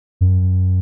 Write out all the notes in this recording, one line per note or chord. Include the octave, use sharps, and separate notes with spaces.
F#2